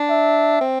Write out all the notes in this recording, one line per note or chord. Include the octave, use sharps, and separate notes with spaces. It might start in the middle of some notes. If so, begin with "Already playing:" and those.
Already playing: D4
E5
C4